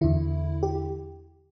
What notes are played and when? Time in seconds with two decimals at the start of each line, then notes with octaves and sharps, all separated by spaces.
0.01 E2 D3 E4
0.63 G4